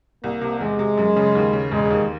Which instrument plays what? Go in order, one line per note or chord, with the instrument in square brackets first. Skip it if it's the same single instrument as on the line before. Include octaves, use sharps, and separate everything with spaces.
[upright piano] C2 [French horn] A#3
[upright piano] C3
[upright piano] E2 [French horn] G#3
[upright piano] C3
F#2
C#3
D#2
C#3
[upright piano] E1 [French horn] G#3
[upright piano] D#2